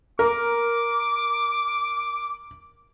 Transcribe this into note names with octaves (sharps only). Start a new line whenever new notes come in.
A#4 D6